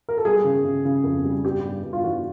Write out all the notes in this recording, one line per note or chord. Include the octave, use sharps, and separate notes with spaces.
A#4
A4
G3 G#4
C#3
C#3
C#3
F2
G3
G2 G4
G2
G2
F4
E3 F#4